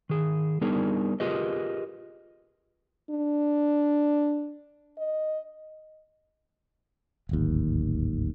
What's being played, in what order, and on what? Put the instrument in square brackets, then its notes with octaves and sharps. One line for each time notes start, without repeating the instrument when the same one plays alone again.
[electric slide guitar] D#3 G#4
G3 B3 D4 D#4 G#4 A#4
F4 G4 G#4 A#4 B4 D#5
[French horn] D4
D#5
[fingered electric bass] D1 G#1 D#2